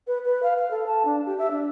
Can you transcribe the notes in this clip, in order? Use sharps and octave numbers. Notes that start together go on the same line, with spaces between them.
B4
B4
F5
F5
A4
A5
D4
G4
E5
D4